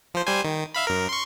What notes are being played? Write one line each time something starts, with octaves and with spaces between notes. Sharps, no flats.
F3 C5
G3 C5 G#5
D#3
E5 F5 B5
F#2 A#4
C6 C#6